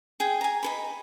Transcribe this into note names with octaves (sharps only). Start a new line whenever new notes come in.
G#4 G5
G#5 A#5
D#4 A4 B5